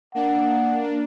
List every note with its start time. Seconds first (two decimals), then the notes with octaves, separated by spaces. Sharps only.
0.15 A#3 D4 F#5